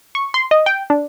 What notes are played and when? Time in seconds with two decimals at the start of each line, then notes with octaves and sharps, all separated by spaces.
0.15 C#6
0.34 C6
0.51 D#5
0.66 G5
0.90 D4